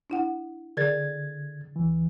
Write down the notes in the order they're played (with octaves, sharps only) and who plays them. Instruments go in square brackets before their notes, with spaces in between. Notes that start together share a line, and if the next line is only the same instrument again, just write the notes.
[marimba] D4 E4 F#5
[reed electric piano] D3 G#6 A6 [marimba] G#4 A#4 D5
[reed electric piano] D2 E3